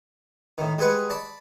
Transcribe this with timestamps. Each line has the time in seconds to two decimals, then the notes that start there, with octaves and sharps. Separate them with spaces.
0.58 A2 D#3
0.78 G3 G#3 G#4 B4 F#5
1.10 D5 A5 B5